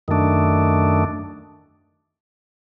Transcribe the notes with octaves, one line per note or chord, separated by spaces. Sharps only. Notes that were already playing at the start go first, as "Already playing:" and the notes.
F#2 D#3 A3 D4